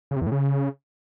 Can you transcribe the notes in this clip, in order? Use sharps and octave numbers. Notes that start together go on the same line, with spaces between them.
C#3
C3
E2
A2
C#3